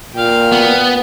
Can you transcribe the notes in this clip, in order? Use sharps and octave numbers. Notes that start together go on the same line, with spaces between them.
A#2 F5 G5
B3